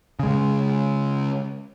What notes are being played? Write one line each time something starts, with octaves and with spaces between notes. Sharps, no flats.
C#3 G#3